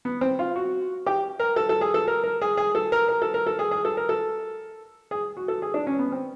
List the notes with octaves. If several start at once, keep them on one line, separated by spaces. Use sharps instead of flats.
B3
C4
F4
F#4
G4
A#4
A4
A4
G#4
A4
A#4
A#4
G#4
G#4
A4
A#4
A#4
A4
A#4
A4
G#4
G#4
A4
A#4
A4
G#4
F#4
A4
G#4
D4
C#4
B3
C4